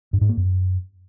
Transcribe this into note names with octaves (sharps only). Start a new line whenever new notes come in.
G2
G#2
A#3
F#2